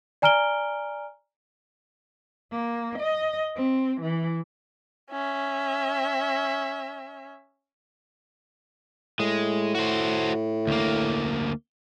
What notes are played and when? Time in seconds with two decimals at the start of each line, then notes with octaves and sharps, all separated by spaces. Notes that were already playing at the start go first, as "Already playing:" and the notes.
0.22 D5 G#5 A#5 F6 D7 G7
2.52 A#3
2.99 D#5
3.56 C4
4.01 E3
5.10 C#4 E5
9.20 A2 G#3
9.75 F#4 C5
10.67 D2 A#3